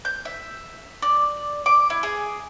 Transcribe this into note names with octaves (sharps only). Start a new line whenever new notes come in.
G6
E5
D5
D6
E4
G#4